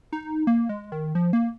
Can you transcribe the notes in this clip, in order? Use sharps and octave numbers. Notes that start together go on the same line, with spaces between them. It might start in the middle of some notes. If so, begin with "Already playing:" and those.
D#4
A#3
G#3
D#3
F3
A#3